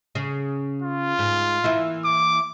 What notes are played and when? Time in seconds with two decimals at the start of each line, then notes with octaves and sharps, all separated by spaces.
0.15 C#3
0.82 F4
1.19 G#2
1.64 E3 A#3 E4
2.05 D6